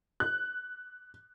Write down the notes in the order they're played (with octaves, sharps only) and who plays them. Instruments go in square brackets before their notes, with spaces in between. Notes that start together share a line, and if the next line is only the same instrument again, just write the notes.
[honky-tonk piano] F#6